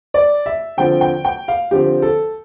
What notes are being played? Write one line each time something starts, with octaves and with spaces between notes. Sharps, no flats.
D5
E5
D3 F3 C4 G5
G5
G5
F5
D3 F3 C4 G4
A4